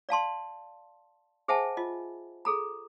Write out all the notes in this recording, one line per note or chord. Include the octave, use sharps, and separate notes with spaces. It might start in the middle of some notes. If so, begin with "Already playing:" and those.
D5 F5 A5 C6
G#4 C5 E5 F#5 G#5 A5
F4 D#5
G#4 A4 A#5